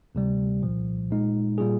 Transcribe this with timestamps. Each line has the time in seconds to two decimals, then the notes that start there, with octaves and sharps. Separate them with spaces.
0.15 D2 C3 G3
0.62 C2 A#2 F3
1.10 A#2 G#3 D#4
1.58 A#2 G3 A#3 F4 G#4